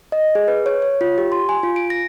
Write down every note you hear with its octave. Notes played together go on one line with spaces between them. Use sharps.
D#5
G#4
B4
C#5
C#5
F4
G4
C6
G#5
F4
D7
A#6